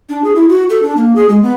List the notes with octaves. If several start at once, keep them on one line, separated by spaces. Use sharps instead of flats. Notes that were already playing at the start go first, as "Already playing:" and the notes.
D4
G#4
E4
F#4
A4
D4
A#3
G#4
G#3
B3